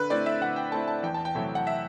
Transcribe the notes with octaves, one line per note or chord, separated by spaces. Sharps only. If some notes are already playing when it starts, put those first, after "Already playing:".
Already playing: D3 B4
A3 C4 E4 D5
E5
D3 F#5
G5
A3 C4 E4 A5
A5
E2 G5
A5
G5
C3 F#3 A3 E4
F#5
E5